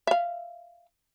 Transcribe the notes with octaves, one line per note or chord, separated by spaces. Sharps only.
E5 F5